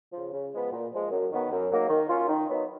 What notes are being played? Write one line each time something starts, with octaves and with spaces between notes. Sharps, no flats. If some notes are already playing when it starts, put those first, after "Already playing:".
C#3 F3
C#3
F3 G#3 B3
A#2
F3 G#3
F#2
D#3 F#3 B3
F#2
C#3 F#3 A#3 D#4
D#3
F#3 C#4 F4
D#3
F#3 B3 D#4